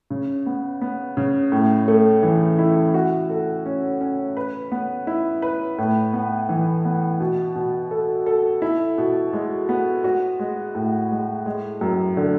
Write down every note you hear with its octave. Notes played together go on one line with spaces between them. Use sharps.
C#3
B3
B3
C#3
A2
A3
E3
E4
F#4
A4
C#4
C#4
B4
B3
E4
B4
A2
B3
E3
B3
B2
B2
A4
A4
E4
B2
G#3
B3
F#4
G#3
A2
G#3
G#3
F#2
D3